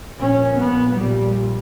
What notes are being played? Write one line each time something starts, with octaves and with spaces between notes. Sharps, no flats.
A#1 A#2 C#4
B3
A#1 A#2 G3